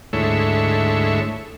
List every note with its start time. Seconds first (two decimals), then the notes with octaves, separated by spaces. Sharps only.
0.13 D2 G#2 A3 E4 C#5